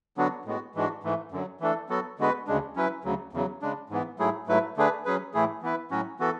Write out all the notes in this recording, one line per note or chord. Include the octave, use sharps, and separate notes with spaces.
D3 F#3 B3 D4 F#4
A2 G#3 B3 F#4
G#2 E3 G#3 D4 F#4
G#2 E3 A3
F#2 D3 F#3
E3 A3 D4 A4
F#3 B3 F#4 A4
D3 G#3 B3 F#4 B4
D2 C#3 G#3 D4
F#3 C#4 E4 B4
D2 C#3 F#3
E2 C#3 F#3
C#3 G#3 D4
G#2 E3 B3
G#2 F#3 A3 E4 G#4
G#2 F#3 A3 E4 B4
D3 A3 D4 G#4 B4
F#3 C#4 G#4 B4
A2 E3 A3 E4 G#4
E3 B3 E4 B4
A2 F#3 C#4 F#4
E3 B3 F#4 A4